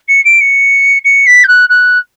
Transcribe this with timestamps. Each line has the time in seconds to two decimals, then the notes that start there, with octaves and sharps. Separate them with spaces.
0.08 C#7
0.24 D7
0.40 C#7
1.04 C#7
1.26 B6
1.44 G6
1.48 F#6
1.69 F#6